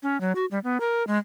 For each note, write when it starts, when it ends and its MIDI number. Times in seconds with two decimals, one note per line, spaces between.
0.03 0.20 61
0.21 0.32 54
0.35 0.45 66
0.51 0.59 55
0.64 0.78 59
0.80 1.06 70
1.07 1.18 56